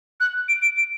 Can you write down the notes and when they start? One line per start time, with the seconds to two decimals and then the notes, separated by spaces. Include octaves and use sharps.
0.20 F#6
0.48 D7
0.62 D7
0.76 D7